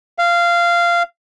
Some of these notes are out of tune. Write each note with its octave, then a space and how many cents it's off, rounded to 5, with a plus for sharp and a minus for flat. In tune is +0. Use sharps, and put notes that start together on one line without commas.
F5 -15